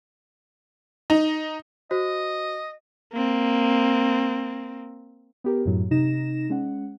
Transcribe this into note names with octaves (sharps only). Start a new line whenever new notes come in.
D#4
F#4 C5 D#5
A#3 C4
B3 G4 A#4
F#2 A2 F#3
C3 D#4 A#6 E7
G#3 C#4 F#5